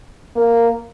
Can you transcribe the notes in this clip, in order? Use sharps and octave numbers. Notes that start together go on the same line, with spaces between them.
A#3